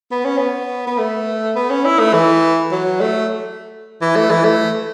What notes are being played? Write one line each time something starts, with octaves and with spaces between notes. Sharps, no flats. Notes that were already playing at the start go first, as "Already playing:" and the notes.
B3
C#4
B3
B3
A3
B3
C#4
E4
A3
E3
F#3
A3
E3
A3
E3
A3